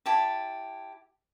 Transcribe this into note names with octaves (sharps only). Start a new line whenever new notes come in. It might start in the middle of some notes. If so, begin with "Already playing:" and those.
E4 G4 A5